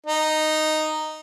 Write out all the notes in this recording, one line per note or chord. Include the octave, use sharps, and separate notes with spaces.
D#4